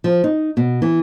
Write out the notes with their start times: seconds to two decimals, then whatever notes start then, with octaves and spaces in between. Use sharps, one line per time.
0.04 F3
0.24 D#4
0.57 B2
0.82 E3